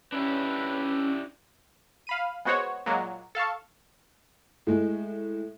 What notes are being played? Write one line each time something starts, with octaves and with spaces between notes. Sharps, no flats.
C#4 D4 E4 G4 B4
F5 B5 D#7
G#3 B3 F#4 C5 C#5
A#2 F#3 G#3
A4 F5 A5 C#6
A2 G#3